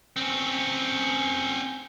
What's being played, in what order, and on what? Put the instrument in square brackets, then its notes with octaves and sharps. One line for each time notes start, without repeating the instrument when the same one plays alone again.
[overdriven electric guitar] C4 C#4